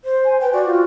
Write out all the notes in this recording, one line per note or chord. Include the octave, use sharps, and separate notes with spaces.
C5
G#5
B4 G5
F#4 D5
F4